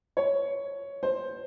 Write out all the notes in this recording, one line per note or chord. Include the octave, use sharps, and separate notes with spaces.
C#5
C5